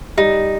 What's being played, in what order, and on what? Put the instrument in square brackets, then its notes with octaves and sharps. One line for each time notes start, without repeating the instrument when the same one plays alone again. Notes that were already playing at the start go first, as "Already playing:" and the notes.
[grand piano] G3 [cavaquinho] D#4